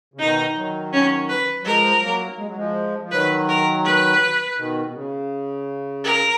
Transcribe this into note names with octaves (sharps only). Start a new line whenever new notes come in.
C#3
B2 D#3 D#4
D#3 F#3
C#4
B4
F#3
F3 G#3 A#4
F#3 A#3
G#3
F#3
F3 G#3
F3
D#3 F#3 B4
A#4
B4
B2 D#3
B2
C#3
A#4